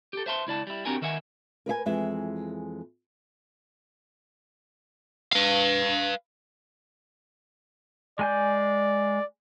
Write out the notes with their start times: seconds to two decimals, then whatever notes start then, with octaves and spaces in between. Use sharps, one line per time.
0.13 G4 A4
0.26 C5 E5 A5 C6
0.47 C#2 E4 D5 A5
0.67 G3 E4
0.86 C4 D4 F#4 G4 A#4 G#5
1.02 D#3 A#4 E5 F#5 G#5
1.66 A#4 B4 E5 G#5
1.86 F2 E3 G#3 E5
5.33 B4 F5
8.19 G#3 D5 G#5 G6